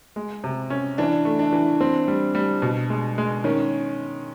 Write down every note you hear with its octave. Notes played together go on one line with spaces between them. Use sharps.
G#3
C3
C#4
E3 D4
A3
D4
E3
C4
G3
G3
B2
G#3
G#3
D#3 C#4